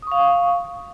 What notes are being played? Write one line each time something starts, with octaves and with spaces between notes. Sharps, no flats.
F5 C#6 D#6